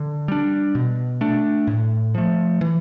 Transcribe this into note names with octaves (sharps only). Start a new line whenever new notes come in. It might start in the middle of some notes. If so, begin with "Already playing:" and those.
Already playing: D3
G3 D4
B2
A3 D4
A2
F3 A3
E3